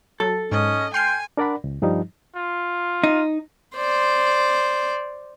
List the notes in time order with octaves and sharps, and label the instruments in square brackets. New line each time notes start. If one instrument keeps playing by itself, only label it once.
[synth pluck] F#3 [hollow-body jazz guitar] A4
[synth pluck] G#2 [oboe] C#4 [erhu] D#5
[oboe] G5 [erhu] G#5 [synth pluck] C6 F6 C7
[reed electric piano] D4 A#4 D5 F#5 B5
C#2
G2 F3 G3 D#4
[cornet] F4
[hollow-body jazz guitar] D#4
[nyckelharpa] C5 D5